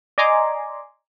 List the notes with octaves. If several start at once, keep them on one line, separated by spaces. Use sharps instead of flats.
D5 D#5 G#5 A#5 C6 D6